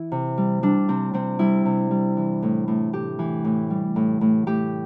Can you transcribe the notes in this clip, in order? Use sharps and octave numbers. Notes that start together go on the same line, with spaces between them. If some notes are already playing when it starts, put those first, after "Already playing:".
Already playing: E3 E4
C3
G3
G3 D4
C3 C4
C3 C4
G3 E4
C3
G3
E3
A2
A2
A2 G4
E3
A2
G3
A2
A2
A2 G4